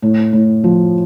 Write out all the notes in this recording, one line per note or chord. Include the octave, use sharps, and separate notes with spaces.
A2
A2
F3